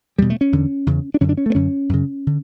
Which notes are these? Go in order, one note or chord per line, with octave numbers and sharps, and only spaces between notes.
E2 B2 G3
A3
C#4
E2 D3
E2 C#3
D4
F#2 D3 C#4
D4
C#4
A3
B3
F#2 D3 C#4
F#2 C#3
D3